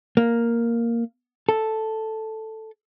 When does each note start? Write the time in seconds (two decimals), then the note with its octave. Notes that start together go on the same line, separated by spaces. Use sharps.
0.17 A#3
1.49 A4